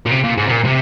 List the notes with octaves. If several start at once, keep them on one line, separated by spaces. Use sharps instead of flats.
A#2
C3
A#2
G#2
C3
A#2
C3